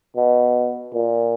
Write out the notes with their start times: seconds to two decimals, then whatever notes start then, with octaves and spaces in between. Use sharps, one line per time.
0.17 B2
0.94 A#2